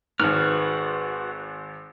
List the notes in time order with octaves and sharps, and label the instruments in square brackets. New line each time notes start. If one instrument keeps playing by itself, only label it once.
[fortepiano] G#1 G#2 [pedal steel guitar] F#4 B4 F6